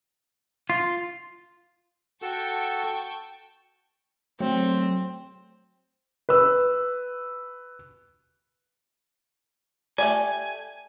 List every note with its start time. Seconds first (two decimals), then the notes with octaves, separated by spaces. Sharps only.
0.70 F4
2.22 F#4 A4 G5 A5 C#6 E6
4.40 F#3 A3 C4
6.29 B4 E6
9.98 A3 G4 D5 G#5